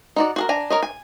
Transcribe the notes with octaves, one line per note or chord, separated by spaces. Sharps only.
D#4 F#4 D5
F#4 G#4 A#4
D4 G#5 A#5
A#4 C#5 D#5
G#5